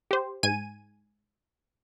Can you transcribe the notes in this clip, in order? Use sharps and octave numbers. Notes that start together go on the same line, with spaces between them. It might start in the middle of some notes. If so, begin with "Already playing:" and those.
G4 C5
G#2 G#5 D#7